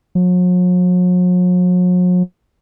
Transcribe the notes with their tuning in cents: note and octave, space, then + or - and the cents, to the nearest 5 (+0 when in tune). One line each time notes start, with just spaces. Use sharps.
F#3 -45